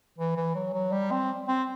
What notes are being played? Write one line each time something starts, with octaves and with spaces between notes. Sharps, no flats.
E3
E3
F#3
F#3
G3
C4
C4